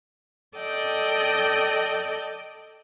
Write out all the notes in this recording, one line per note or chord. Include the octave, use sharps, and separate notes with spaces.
A4 D5 D#5 G5